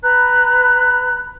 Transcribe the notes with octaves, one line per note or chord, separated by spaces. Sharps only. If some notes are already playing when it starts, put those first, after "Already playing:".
B4 A#5 B5 F#6